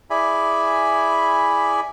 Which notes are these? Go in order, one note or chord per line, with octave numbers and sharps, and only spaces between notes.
E4 G#4 D5 E5 G#5 B5